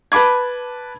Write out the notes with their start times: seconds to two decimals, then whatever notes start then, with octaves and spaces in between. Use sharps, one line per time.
0.12 B4 A5 B5 D6 G#6